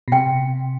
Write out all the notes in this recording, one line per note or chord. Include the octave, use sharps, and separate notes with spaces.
B2
C3 G5